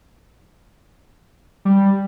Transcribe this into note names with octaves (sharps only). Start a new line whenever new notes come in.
G3